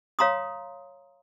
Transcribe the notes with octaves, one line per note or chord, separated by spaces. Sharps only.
C#5 F5 A#5 C6 D#6